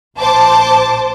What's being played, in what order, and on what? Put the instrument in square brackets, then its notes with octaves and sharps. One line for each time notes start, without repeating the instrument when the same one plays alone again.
[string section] A#1 C5 A5 D6